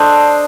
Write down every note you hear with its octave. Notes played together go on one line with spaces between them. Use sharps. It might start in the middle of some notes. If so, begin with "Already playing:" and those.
Already playing: D4 A4 C5 D#5